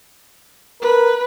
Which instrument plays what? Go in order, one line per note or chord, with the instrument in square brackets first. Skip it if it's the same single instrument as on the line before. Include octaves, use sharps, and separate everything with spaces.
[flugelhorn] A#4 [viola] B4